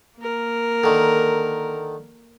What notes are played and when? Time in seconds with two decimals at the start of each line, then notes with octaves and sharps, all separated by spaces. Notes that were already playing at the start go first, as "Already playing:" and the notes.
0.18 A#3 A#4
0.84 D3 D#3